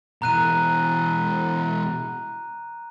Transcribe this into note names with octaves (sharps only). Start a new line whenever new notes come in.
B2 E3 A#5 F#6 D#7